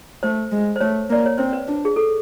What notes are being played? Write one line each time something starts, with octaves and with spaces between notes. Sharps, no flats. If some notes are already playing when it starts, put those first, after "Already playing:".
A3 C5
G#3
C5
A3 C#5
A#3 D5
C#5
C4 C5
B4
D4
G#4
A4